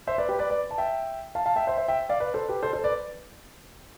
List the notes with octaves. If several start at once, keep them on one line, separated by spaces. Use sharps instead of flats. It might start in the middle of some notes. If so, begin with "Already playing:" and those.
C5 E5
B4 D5
G4 B4
B4 D5
B4 D5
A5
E5 G5
F5 A5
F5 A5
E5 G5
C5 E5
C5 E5
E5 G5
D5 F5
B4 D5
A4 C5
G4 B4
A4 C5
A4 C5
B4 D5